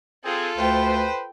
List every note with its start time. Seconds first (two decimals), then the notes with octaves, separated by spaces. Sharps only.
0.24 C4 F4 G#4 A4
0.58 D2 B4 C5 G5